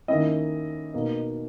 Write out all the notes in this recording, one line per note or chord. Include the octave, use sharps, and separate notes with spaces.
D#3 A#3 C#4 E4 D#5
B2 A#3 D#4